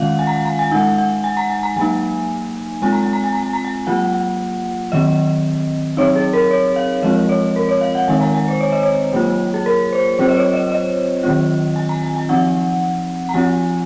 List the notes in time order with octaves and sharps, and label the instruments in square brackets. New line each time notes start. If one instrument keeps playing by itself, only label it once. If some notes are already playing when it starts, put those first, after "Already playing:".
Already playing: [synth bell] D#3 G#3 C#4 F4 F5 F#5
G#5
A#5
G#5
A#5
G#5
G#3 D#4 F#5
F#5
G#5
A#5
G#5
A#5
F#3 A#3 D#4 G#5
G#3 C4 F4 G#5
A#5
G#5
A#5
G#5
A#5
G#5
A#5
G#5
F#3 A#3 F4 F#5
D#3 F#3 C4 D#5
F#3 C4 D#4 C#5
G#4
A#4
C#5
F5
F3 G#3 C4 F4 D#5
C#5
A#4
C#5
F5
F#5
D#3 G#3 C4 D#4 G#5
A#5
G#5
C5
C#5
D#5
C#5
F#3 A#3 F4
G#4
A#4
C5
F#3 C4 F4 C5
D#5
C#5
D#5
D#5
D#3 F#3 C4 F4
G#5
A#5
G#5
G#5
F3 C4 D#4 F#5
A#5
F3 C4 F4 G#5